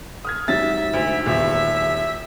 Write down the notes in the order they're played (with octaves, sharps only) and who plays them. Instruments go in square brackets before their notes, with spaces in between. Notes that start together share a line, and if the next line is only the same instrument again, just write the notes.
[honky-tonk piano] D#6 F6 G#6
[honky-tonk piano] G#2 F#3 G4 [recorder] E5 [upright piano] A6
[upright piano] D2
[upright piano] D#1 E2 [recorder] E5